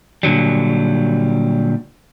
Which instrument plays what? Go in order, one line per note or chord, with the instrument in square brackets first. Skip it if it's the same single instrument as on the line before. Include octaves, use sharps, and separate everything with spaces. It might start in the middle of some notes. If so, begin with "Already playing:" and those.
[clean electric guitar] A#2 D3 F#3 G3